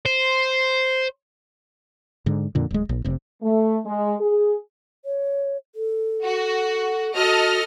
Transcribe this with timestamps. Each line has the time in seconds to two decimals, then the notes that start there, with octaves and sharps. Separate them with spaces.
0.06 C5
2.26 G#2 D3
2.55 F2 A#2 D3
2.71 D1 G#3
2.89 A#1
3.04 F1 C3
3.43 A3
3.86 G#3
4.20 G#4
5.05 C#5
5.75 A4
6.24 F#4
7.16 F#4 A4 D#5 F6